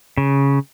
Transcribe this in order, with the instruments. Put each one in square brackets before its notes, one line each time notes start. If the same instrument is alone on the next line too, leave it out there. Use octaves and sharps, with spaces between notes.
[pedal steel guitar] C#3